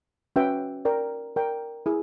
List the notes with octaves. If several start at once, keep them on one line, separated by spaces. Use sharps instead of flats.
C#4 F#4 B4 E5 G5
A#4 D5 G5
A#4 D5 G5
E4 G#4